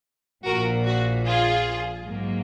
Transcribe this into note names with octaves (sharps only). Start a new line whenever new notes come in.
A#1 A#2 F3 F#4 A#4
F#4
F4 G#4
G#2 F#3 A#3